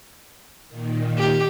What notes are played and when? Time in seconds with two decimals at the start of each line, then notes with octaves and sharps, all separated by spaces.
0.69 A#2 D#3
1.18 G4